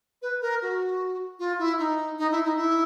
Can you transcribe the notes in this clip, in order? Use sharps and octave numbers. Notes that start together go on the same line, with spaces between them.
B4
A#4
F#4
F4
E4
D#4
D#4
E4
D#4
E4